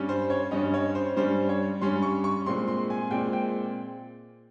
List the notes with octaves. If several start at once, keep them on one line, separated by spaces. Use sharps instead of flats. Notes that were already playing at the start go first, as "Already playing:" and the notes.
Already playing: G2 G3 C#4
C5
C#5
G2 G3 C#4 D#5
C#5
C5
G2 G3 C#4 C5
C#5
G2 G3 C#4 C6
C#6
C#6
A#2 G#3 C4 C6
C6
G#5
A#2 G#3 C4 G5
G5